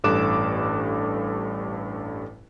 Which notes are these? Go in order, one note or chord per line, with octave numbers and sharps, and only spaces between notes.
A1 G2 A4 D6 F#6 E7